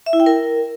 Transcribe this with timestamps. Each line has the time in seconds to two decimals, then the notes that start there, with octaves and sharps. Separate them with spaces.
0.06 E5
0.13 E4
0.20 G5
0.26 A#4